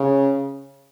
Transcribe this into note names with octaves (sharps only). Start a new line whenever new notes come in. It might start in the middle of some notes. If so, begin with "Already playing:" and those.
Already playing: C#3